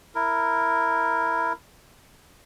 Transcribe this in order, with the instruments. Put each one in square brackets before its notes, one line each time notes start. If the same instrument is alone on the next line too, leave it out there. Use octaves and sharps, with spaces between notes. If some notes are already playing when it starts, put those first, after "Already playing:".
[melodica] E4 A#4